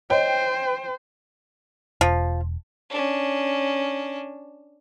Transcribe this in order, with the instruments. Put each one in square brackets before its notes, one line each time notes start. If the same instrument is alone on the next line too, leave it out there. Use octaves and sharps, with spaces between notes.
[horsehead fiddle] C5 [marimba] C#5 D#5 [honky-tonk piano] G5
[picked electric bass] E1 [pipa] F3
[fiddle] C#4 D4